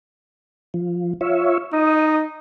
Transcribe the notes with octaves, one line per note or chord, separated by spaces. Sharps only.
F3
F4 C#5 E5
D#4 D#5